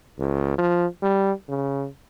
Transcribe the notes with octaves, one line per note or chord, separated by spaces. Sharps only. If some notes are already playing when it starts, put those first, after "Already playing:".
C#2
F3
G3
C#3